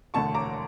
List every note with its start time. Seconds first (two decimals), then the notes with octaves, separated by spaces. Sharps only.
0.14 E1 D2 D3 A5 C#6
0.35 A#5 D6